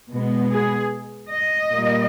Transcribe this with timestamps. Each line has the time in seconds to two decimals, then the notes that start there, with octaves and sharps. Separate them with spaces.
0.11 B2 G#3 B3
0.51 G#4
1.30 D#5
1.70 A#2 G3 A#3